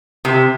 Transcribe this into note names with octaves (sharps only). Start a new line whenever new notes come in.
C3